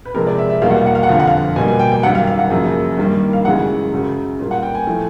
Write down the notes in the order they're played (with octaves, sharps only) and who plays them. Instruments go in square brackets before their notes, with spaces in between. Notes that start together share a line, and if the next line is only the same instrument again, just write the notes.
[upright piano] B4
C3 F3 G#3 A#4
D5
E5
E5
E2 B2 G3 A#3 F5
F#5
F5
F#5
F5
F#5
F2 D3 F3 F5
F#5
F5
B2 G3 A#3 G#5
G#5
G5
G5
F#2 D#3 G3 F#5
F5
F5
F#5
F#2 C#3 F3 A#3
G2 D#3 G3 A#3
F5
F#2 C#3 E3 G#3 F#5
F#2 C#3 F#3
A#2 G3 A#3
F#5
G5
G#5
A2 F3 A3